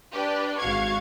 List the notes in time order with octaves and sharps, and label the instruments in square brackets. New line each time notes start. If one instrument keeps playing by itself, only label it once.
[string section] D4 G4 B4
G#1 F#4 F5 C#6 G#6